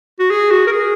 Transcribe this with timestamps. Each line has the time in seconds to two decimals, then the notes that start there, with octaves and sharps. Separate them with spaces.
0.19 F#4
0.30 G#4
0.51 F#4
0.67 A#4
0.72 G#4